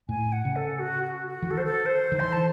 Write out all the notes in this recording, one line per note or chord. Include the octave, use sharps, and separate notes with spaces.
A2 G#5
F#5
C#3
A4
F#4
F#4
F#4
E3
D#3 A4
C5
A4
C5
D#3
E3 C6
A5